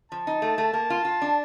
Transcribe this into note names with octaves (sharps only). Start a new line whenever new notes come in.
F3 A5
D#4
A3
A3
A#3
F4
F4
D4